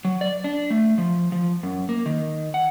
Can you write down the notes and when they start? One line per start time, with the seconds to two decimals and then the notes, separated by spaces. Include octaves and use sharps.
0.05 F#3
0.21 D5
0.44 D4
0.70 A3
0.98 F3
1.32 F3
1.63 F#2
1.89 A#3
2.06 D#3
2.54 F#5